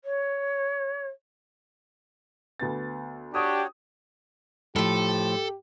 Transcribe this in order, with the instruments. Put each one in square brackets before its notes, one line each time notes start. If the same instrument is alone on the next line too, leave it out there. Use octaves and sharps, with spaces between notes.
[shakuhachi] C#5
[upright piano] D2 B3 A6
[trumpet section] D4 G4 [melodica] F#4 C#5 [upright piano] D#6
[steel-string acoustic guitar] A2 F3 [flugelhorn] G4 [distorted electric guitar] A4